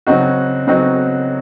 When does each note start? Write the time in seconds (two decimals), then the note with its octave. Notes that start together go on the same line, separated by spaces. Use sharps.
0.07 C#3 F#3 C4 D#4 F#4
0.67 C#3 F#3 C4 D#4 F#4